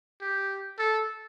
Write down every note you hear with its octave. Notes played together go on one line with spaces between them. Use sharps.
G4
A4